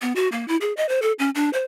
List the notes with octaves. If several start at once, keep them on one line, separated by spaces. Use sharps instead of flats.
B3
F#4
A#3
E4
G#4
D#5
C5
A4
C#4
D4
C5